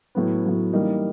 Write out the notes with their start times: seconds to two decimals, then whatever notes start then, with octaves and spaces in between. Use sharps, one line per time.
0.15 A2 F#3 B3
0.44 A2 F#3 B3
0.73 E3 G3 A#3 D#4